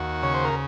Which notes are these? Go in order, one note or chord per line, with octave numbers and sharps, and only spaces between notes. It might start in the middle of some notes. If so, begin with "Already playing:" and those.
Already playing: D#2 F#4
C#3 C#5
C5
A#4